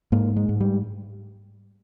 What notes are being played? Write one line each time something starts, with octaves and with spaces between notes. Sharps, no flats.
G#2 A#3
G#3
G#2
G3